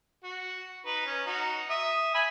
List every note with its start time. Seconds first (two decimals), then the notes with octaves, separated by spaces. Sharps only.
0.24 F#4
0.86 D#4 B4
1.05 C#4
1.26 D#4 F#4
1.70 E5 D#6
2.14 E5 G#5 B5